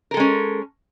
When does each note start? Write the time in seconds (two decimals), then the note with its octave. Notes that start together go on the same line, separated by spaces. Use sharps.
0.11 A#4
0.14 A4
0.17 G#3
0.20 C#4